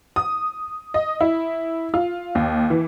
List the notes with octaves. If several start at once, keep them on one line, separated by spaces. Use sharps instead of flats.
D#6
D#5
E4
F4
D#2
E3